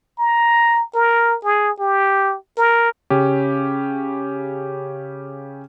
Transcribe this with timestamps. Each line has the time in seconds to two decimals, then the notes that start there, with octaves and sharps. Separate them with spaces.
0.19 A#5
0.95 A#4
1.44 G#4
1.79 G4
2.57 A#4
3.10 C#3 C#4 G4